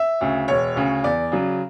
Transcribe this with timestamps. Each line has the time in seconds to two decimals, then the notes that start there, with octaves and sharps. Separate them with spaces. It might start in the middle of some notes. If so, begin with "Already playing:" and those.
Already playing: E5
0.21 D2 C#3
0.48 E1 C#5
0.76 D2 C#3
1.04 E2 D5
1.32 C#3 F#3